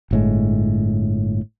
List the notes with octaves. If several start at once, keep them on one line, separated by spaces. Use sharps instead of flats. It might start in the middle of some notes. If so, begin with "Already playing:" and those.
G1 A2 G#3